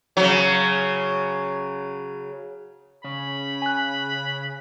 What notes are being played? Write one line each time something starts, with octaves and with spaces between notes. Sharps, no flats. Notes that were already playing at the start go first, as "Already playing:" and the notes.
C#3 F#3
C#3 B5
G#5 F#6